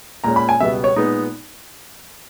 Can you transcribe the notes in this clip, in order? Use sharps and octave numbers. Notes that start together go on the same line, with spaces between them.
A#2 G#3 C#4 A#5
B5
G#5
C#2 B2 G3 B3 E5
C#5
A#2 G#3 B3 D#4